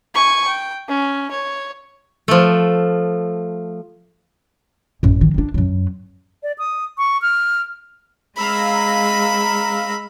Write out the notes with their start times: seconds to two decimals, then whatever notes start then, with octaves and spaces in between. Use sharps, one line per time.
0.14 G#5 C#6
0.47 G5
0.89 C#4
1.31 C#5
2.28 F3 A3
5.03 A1 F#2
5.21 D#3
5.34 D#3 D4
5.54 F#2 F#3
6.43 D5
6.58 D#6
6.98 C#6
7.22 F6
8.38 G#3 F5 A#5 B5 E6